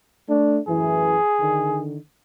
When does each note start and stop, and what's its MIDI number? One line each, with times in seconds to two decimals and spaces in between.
0.28 0.59 57
0.28 0.59 62
0.68 1.18 42
0.68 1.18 45
0.68 1.18 52
0.68 1.82 68
1.39 1.97 50
1.39 1.97 51